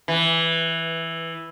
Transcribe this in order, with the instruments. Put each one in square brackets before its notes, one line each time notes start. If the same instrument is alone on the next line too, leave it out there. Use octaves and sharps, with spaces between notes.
[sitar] E3